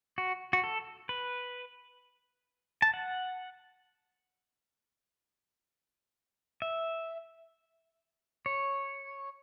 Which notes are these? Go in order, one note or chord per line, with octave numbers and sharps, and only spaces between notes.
F#4
F#4
A4
B4
A5
F#5
E5
C#5